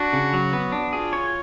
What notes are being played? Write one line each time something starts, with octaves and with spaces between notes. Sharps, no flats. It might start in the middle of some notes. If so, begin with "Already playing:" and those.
Already playing: D4 F#4
C#3
F#3
B3
D4
F4 G#4
C#5